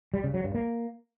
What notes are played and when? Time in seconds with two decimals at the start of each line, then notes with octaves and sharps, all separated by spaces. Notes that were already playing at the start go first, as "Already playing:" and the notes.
0.14 G3
0.24 C#3
0.34 F#3
0.44 G2
0.54 A#3